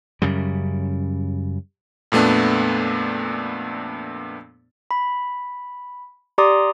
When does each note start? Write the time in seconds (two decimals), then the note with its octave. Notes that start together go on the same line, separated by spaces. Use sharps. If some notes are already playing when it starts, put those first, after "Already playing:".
0.22 F#2 C#3 G3
2.12 F2 A#2 A3 B3 D4
4.91 B5
6.38 G4 D5 A#5 C6 D6 D#6